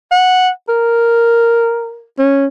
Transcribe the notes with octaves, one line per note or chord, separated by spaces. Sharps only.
F#5
A#4
C#4